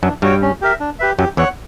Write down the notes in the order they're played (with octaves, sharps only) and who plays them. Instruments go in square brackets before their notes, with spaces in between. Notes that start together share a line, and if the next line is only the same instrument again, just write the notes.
[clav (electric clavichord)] F#2 F#3 [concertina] D4
[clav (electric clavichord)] G2 G3 [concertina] F#4 C#5 G5
[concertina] C#4
G4 A#4 E5
D4
G4 B4 E5
[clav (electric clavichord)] F#2 F#3 [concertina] G4
[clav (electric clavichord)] E2 E3 [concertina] C#5 F#5